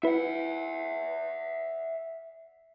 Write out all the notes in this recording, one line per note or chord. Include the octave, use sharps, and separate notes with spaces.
E4 B4 E5 F#5